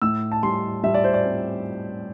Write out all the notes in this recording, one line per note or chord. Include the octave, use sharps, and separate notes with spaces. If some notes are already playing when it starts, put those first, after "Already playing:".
A2 E6
A5
G3 C6
G3 E5
D5
C5
D5
C4